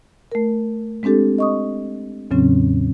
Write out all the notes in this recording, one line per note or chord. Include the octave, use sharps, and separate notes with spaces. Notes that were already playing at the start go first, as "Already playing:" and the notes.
A3 A#4
G#3 C4 D4 G4 A4
D#5 C#6 D#6
E2 A2 C#3 F#3 C4 C#4